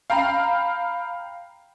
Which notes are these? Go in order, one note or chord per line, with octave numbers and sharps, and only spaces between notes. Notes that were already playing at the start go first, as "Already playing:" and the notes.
F5 G5 A#5 B5